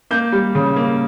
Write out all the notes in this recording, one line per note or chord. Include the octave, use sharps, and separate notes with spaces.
A#3 G6
G3
C#3
A#3